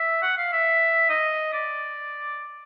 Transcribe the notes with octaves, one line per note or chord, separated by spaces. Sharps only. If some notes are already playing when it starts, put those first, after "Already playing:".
Already playing: E5
F#5
F5
E5
D#5
D5